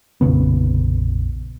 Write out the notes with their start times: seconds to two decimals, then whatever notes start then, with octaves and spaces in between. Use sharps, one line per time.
0.21 F1 A#1 C#3 B3